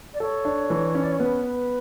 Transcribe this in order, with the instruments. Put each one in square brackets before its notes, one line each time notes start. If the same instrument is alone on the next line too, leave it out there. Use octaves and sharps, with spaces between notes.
[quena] D5
[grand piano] A4 [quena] C#5
[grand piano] D4
E3
C#4
[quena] D5
C#5
[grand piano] B3 [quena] B4